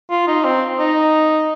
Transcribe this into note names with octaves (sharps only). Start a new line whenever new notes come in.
F4
D#4
C4
D#4